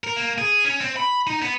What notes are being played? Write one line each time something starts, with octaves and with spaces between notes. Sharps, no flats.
A#4
A#3
G#4
C#4
C4
B5
D#4
B3